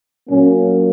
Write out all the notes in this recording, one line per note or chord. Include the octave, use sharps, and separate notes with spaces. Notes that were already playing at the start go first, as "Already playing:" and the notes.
A#2 F#3 A#3 C#4